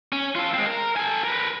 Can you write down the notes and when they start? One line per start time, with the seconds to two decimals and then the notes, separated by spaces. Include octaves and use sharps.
0.12 C#4
0.35 F4 A4
0.54 G#3 C4
0.66 A#4
0.96 A4 G#5
1.24 A#4 B4